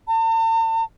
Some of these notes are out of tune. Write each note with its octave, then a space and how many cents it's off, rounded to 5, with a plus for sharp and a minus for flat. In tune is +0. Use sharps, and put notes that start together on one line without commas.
A5 +45